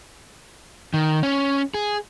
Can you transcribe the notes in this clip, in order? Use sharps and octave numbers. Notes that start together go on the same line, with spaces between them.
D#3
C#4
G#4